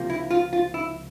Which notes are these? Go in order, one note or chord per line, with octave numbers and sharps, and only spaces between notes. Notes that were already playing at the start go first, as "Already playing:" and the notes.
Already playing: C#2 C3 F3 A#3
E4
F4
F4
E4